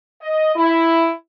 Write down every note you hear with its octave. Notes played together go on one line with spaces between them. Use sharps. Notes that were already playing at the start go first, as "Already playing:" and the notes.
D#5
E4